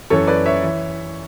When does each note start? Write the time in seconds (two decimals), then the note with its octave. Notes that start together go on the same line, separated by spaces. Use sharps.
0.10 F#2 E3 A4 C#5
0.28 B4 D5
0.46 C#5 E5
0.63 E3